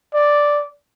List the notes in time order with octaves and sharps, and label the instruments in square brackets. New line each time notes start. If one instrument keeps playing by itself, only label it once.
[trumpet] D5